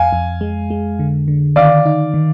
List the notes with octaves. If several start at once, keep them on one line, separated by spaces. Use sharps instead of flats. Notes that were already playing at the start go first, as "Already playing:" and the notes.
Already playing: F2 F5 G#5
F2
G#3
G#3
D3
D3
D#3 D5 F5
D#4
D#3